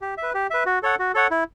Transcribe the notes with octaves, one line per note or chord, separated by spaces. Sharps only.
G4
E5
B4
G4
B4 E5
F#4
A4 C#5 F#5
F#4
A4 C#5 F#5
E4